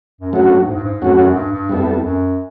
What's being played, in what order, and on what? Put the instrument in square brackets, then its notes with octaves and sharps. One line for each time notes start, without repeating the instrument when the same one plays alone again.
[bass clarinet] F#2
[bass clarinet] G2 [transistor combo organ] F#3 A3 C#4 F#4
[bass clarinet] G#2
G2
G#2
[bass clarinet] F2 [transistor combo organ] F#3 A3 C#4 F#4
[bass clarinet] F#2
G2
G2
[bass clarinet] F2 [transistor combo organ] G3 B3 E4 A4
[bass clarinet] F#2